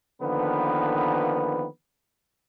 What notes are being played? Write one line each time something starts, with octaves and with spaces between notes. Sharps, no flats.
D3 D#3 F3 A#3 B3 B4